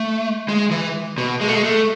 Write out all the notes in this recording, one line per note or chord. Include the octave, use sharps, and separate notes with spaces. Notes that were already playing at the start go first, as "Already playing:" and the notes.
Already playing: A3
G#3
E3
B2
G#3
A3
G#3
A3